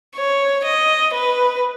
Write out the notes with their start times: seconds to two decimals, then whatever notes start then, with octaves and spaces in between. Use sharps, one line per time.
0.16 C#5
0.65 D#5
1.14 B4